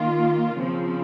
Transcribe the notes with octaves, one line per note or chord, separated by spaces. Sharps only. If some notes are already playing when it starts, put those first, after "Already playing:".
Already playing: D#3 A#3 F4
C#3 F3 C4